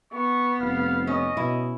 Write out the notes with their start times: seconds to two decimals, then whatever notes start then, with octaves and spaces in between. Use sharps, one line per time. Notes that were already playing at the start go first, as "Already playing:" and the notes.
0.13 B3 C#6
0.61 F1 F5
1.07 C#4 D#5
1.37 B2 E4